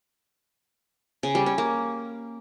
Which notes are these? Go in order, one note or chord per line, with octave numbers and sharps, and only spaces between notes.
C#3
G3
C#4
A#3